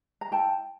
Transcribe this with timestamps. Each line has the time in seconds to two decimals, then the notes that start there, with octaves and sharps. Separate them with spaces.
0.21 A#5
0.31 E4 G5 A5